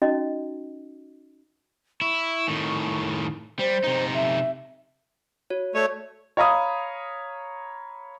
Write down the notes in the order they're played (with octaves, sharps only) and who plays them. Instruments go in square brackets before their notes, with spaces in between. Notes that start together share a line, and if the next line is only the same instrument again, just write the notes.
[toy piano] C#4 D#4 F#4 D#5
[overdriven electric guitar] E4 [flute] C#6
[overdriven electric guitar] A2 D#3
[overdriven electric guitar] G3 [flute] C5
[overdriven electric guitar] C3 D#4
[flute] E5
[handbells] F#4 C#5
[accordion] A3 C#5 [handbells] D5
[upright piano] C#5 F5 A#5 B5 D#6